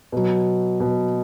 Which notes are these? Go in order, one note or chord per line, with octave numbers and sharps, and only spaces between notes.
B2 F#3
B2 F#3